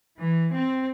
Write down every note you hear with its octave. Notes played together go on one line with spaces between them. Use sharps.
E3
C4